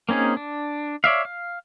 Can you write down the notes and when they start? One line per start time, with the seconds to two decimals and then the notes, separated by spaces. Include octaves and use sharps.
0.09 A#3 C4 C#4 D#4 G#4
0.37 D4
1.04 C#5 D5 E5 F5
1.25 F5